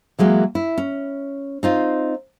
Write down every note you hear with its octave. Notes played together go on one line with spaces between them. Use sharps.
E3 F#3 G#3 A#3
E4
C#4
C4 D#4 F4